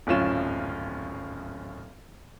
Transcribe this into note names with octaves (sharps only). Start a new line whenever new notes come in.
D1 G#1 F#2 C#4 F4 E7